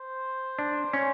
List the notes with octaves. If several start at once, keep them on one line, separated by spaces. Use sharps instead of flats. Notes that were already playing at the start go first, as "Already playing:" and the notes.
Already playing: C5
D4
C#4